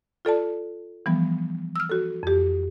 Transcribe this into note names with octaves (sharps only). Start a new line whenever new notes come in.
F4 A4 D5 A5
E3 F3 G3 B3
E6 F6
F#4 A4
F2 G4